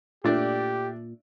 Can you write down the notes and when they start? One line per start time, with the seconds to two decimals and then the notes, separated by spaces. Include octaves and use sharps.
0.24 A#2 A3 D4 G4 D5